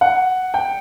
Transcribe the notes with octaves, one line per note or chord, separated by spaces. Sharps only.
F#5
G5